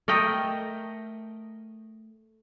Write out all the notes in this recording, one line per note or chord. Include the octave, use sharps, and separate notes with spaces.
A3 A#4 D#5 G5